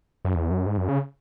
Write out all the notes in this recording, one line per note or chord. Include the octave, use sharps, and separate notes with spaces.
F#2
E2
F#2
G#2
F#2
C#3